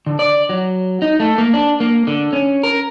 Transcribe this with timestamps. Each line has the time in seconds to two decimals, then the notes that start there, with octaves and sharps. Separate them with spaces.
0.06 D3
0.19 D5
0.49 F#3
1.02 D#4
1.20 A3
1.38 A#3
1.54 D4
1.80 A#3
2.07 D3
2.33 C#4
2.63 A#4